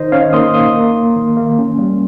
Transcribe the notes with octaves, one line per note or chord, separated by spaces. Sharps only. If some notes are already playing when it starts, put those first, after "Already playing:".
Already playing: D#3 D#4 C5 D#5
C#4 C#5 F5
A#3 C6 D#6
A#3 C6 D#6
A#3
A#3
D#3
A#3
C#4
G3